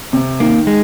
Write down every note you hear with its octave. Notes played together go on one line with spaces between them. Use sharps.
C3
D#3 A#3
G#3